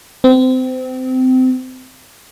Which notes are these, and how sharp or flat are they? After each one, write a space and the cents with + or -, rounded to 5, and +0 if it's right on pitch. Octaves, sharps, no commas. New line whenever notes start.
C4 -25